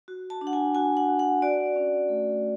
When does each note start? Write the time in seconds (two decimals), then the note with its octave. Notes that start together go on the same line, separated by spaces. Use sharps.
0.08 F#4
0.30 A5
0.41 D4
0.47 F#5
0.53 G#5
0.75 F#4 G#5
0.97 F#5
1.09 F#4
1.19 F#5
1.42 F#4 D5
1.76 C#4
2.09 A3